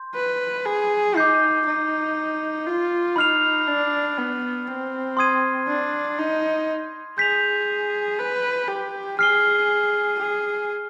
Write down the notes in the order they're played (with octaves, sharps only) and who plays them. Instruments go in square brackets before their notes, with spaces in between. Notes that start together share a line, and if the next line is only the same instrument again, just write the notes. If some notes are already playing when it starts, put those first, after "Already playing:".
Already playing: [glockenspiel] C6 G6
[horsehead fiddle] B4
G#4
[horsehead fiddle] D#4 [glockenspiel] D6 G6 C7
[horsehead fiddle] D#4
F4
[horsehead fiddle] D#4 [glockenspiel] B5 F6 C7 F7
[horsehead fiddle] D4
B3
C4
[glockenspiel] C6 D#6 G#6 C7 D#7
[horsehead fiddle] D4
D#4
[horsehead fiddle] G#4 [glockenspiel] G6 B6 F7
[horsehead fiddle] B4
G4
[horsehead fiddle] G#4 [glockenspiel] F6 C7 G7
[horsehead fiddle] G#4